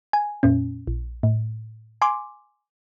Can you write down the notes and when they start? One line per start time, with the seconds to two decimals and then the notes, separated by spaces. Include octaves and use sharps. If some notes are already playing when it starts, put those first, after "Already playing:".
0.13 G#5
0.43 F2 A#2 C#4
0.87 A#1
1.23 A2
2.02 G#5 C6 D6